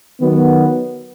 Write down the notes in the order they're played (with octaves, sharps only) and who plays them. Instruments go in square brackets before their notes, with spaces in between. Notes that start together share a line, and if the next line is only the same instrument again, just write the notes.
[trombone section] D#3 F#3 B3